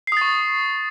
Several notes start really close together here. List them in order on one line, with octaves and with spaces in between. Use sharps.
C7 D#6 A6 C#6